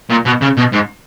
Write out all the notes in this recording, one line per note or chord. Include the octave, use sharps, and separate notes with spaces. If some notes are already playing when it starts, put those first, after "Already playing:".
A#2
B2
C#3
B2
G#2